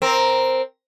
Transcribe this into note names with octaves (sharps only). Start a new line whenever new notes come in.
C4 A#4